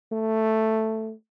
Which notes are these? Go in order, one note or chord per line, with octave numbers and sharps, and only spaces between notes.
A3